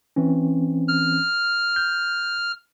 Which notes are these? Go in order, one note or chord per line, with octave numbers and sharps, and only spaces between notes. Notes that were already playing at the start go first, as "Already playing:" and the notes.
E3 C4 C#4
F6
G6